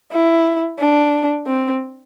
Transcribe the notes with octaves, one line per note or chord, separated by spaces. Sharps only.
E4
D4
C4